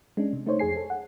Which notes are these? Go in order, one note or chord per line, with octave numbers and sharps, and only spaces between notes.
G#3 C#4 D4
C3
A3 D#4 C5 C#5
F2 G#4 G#5 C7
A4
F#5